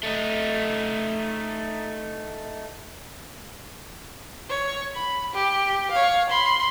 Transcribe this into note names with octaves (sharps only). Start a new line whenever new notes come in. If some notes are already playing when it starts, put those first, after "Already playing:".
A3 D#4
C#5
B5
G4
C#5 F5
B5 C6